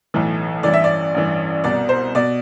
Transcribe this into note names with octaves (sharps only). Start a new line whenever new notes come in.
B1 A2 E3
A1 G2 E3 D5
E5
D5
A1 G2 E3
C2 B2 D5
C5
B2 D5